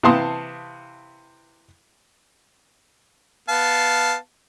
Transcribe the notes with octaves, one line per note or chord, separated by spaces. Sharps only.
C3 E3 F5 A5 C6 D#6
B3 F5 A5